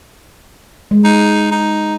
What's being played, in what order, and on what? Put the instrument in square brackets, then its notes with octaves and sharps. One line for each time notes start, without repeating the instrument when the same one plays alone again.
[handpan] G#3
[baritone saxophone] D#4
D#4